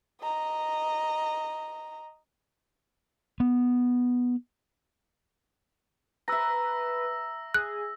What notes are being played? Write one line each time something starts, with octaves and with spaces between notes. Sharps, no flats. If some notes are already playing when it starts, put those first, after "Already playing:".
D#5 A#5
B3
B4 E5 A#5 E6 A#6
G#4 F#6